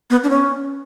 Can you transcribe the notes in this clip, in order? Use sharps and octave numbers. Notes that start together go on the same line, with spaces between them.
B3
D4
C#4